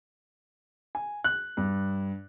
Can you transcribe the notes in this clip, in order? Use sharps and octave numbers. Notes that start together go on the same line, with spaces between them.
G#5
F#6
G2